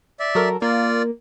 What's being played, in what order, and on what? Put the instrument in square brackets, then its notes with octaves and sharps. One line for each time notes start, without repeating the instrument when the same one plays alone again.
[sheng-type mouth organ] D5 E5
[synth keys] F#3 A4 A#4
[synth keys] A#3 [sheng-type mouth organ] F4 D5